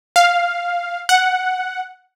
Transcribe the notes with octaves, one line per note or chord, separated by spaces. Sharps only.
F5
F#5